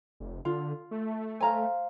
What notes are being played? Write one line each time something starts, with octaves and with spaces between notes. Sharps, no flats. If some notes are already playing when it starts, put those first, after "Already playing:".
F1
D3 F4
A3
C5 F5 G#5 A#5